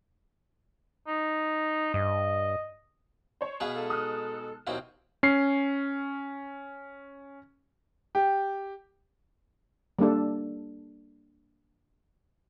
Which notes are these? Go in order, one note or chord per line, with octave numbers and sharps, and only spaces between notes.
D#4
G2 D#5
C5 C#5
B2 B3 G#4 E5 F5 G#5
G#3 D#4 A4
D#6 F6 F#6
D#2 B2 F#3 C4 E4 F5 G5
C#4 C7
G4
G3 A#3 D4 A4